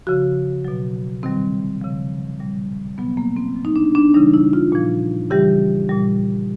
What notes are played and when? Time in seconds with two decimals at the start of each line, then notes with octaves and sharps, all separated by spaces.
0.07 C#3 F3 F#4
0.65 B2 F#3
1.23 C3 D#3 G3 C4
1.81 C#3 F3
2.39 A#2 G3
2.98 B2 F#3 B3
3.17 A#3
3.36 C4
3.56 A#2 F#3
3.65 D#4
3.76 D4
3.95 D4
4.14 C#3 E3 G3 D#4
4.34 E4
4.53 F4
4.73 A#2 F3
5.31 C#3 E3 G3 G4
5.89 A#2 G3